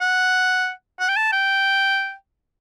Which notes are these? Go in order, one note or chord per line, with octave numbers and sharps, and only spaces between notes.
F#5
F#5
G5
A5
G5